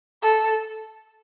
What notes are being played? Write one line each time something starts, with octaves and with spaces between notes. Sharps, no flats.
A4